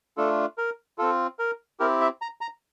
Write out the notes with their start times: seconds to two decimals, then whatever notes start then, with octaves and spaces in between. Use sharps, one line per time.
0.17 A3 D4 F4 A4
0.58 A#4
0.98 C4 F4 A4
1.39 A#4
1.80 C4 E4 G4 A#4
2.01 E5
2.22 A#5
2.41 A#5